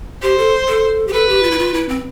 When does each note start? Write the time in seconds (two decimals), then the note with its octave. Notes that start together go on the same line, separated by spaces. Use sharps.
0.22 G4 C5
0.38 A4
0.68 A4
1.08 G4
1.13 A4 B4
1.29 G4
1.43 F4
1.51 E4
1.59 F4
1.74 E4
1.89 C4